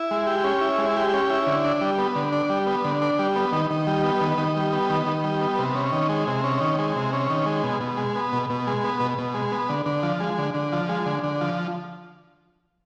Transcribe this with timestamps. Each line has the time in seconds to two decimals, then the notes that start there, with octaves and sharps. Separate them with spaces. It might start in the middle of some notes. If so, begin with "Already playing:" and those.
Already playing: E4
0.11 G#3
0.27 G4
0.44 C#4
0.61 E4
0.78 G#3
0.96 G4
1.14 C#4
1.30 E4
1.47 D3
1.64 D4
1.81 G3
1.98 B3
2.16 D3
2.32 D4
2.49 G3
2.66 B3
2.84 D3
3.02 D4
3.19 G3
3.36 B3
3.52 D#3
3.70 D#3
3.87 G3
4.04 B3
4.21 D#3
4.38 D#3
4.56 G3
4.73 B3
4.89 D#3
5.06 D#3
5.24 G3
5.41 B3
5.58 C3
5.75 C#4
5.92 D#3
6.09 G#3
6.27 C3
6.44 C#4
6.60 D#3
6.78 G#3
6.96 C3
7.13 C#4
7.30 D#3
7.46 G#3
7.63 B2
7.81 B2
7.97 G#3
8.16 B3
8.33 B2
8.50 B2
8.67 G#3
8.84 B3
9.00 B2
9.18 B2
9.34 G#3
9.52 B3
9.69 D3
9.86 D3
10.03 F3
10.20 G#3
10.38 D3
10.54 D3
10.72 F3
10.89 G#3
11.06 D3
11.23 D3
11.41 F3